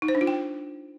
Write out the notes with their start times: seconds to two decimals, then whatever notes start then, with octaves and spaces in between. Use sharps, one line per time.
0.02 D#4
0.08 C5
0.15 D4
0.21 F4
0.27 G5